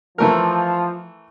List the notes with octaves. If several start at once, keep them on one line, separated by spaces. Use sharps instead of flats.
E3 F3 A3 A#4